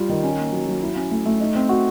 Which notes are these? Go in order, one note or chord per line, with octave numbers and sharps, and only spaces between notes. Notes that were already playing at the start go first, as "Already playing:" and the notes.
Already playing: G3 F4
D#3
C#4
A#3
F#3
F#3
E4
C#4
A3
A3
D#4
C4
F#4